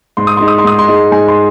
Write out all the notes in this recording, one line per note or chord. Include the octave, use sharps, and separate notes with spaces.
G#2 C6
D#6
G#3 D#4 C6
D#6
C6
G#2 D#6
C6
G#3 D#4
G#2 G#5
C6